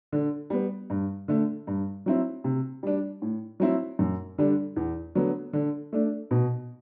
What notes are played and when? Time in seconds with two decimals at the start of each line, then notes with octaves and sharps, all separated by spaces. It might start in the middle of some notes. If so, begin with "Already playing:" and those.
0.12 D3
0.50 G3 B3
0.90 G2
1.28 D3 A3
1.67 G2
2.06 F#3 C4 E4
2.44 C3
2.83 G3 D4
3.22 A2
3.60 F#3 C4 E4
3.99 F#2
4.38 D3 G3 D4
4.76 E2
5.15 D3 F#3 B3
5.53 D3
5.93 A3 D4
6.31 B2